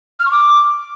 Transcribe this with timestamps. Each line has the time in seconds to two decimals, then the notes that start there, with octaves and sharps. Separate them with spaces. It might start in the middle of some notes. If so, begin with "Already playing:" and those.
0.20 F6
0.25 C#6
0.31 D6